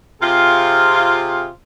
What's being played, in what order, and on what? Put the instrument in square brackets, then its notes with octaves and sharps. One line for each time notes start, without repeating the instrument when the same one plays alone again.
[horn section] C3 F4 G#4